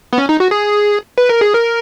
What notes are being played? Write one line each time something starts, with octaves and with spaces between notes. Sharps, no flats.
B3
C#4
D#4
F#4
G#4
B4
A#4
G#4
A#4